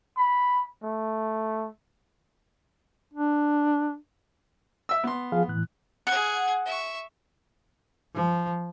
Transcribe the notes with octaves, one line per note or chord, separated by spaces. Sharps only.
B5
A3
D4
E5 E6
B3 C6
F3 G#4 F5
A2 E3 F#6
G#4 F#5 G#6
E5 C#6
F3